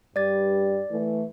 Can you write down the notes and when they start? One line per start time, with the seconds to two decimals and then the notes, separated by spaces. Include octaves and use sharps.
0.16 G2 G3 D5 A6
0.91 E3 A3